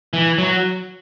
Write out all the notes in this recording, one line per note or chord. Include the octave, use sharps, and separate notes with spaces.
E3
F#3